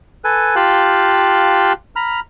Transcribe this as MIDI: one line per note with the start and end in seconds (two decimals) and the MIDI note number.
0.24 0.55 69
0.24 0.55 71
0.24 0.55 80
0.56 1.73 65
0.56 1.73 67
0.56 1.73 77
0.56 1.73 79
0.56 1.73 81
0.56 1.73 90
1.96 2.20 82
1.96 2.20 83
1.96 2.20 89